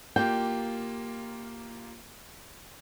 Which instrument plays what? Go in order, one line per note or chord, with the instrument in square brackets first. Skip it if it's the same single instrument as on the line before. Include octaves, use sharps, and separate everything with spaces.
[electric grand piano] A#3 F4 G4 [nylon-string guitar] G5